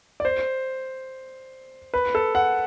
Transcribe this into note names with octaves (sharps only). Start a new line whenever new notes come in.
D5
C5
B4
A4
F#5